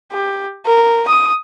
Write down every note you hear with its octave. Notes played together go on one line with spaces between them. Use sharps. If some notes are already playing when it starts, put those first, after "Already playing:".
G4
A#4
D#6